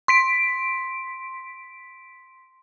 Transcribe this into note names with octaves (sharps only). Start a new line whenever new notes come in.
C6 B6 D7